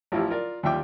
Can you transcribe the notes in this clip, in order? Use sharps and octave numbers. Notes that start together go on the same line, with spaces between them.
A1 F3 E4 F4 G4
F4 A#4 D5
D#2 G3 F4 E5 G5 D6